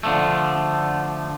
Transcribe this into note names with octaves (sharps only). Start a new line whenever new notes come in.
D3 F3 A3